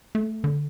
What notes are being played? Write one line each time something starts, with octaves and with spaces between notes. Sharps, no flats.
A3
D3